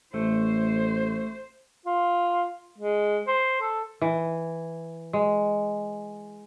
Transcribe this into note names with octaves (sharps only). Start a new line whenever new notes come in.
A1 A3 C5
F4
G#3
C5
A4
E3
G#3